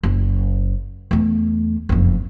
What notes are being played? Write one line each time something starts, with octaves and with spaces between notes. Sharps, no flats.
F#1
E2 A3
F#1 F2